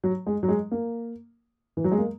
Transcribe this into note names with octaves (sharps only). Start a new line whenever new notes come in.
F#3
G#3
F#3
G#3
A#3
E3
F#3
G#3
A#3